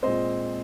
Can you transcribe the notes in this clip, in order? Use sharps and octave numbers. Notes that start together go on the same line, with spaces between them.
A#2 G#3 C4 C5 D#5